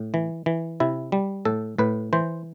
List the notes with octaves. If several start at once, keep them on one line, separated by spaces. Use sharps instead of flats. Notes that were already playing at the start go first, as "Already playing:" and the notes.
Already playing: A2
E3
E3
C3 E4
G3
A2 A4
A2 B4
E3 C5